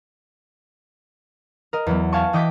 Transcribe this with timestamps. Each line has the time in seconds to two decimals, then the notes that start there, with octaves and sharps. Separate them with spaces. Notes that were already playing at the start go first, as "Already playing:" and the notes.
1.73 A#4 D#5
1.87 E2 F#3 B3
2.13 F5 G#5 A5 C#6
2.33 E3 D#5 G5 D6 G6 B6